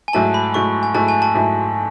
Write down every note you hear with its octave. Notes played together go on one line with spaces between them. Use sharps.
G#5
G#2 F#3 A3 E4 A5
B5
G#2 F#3 A3 E4 C#6
G#5
G#2 F#3 A3 E4 A5
G#5
A5
G#2 F#3 A3 E4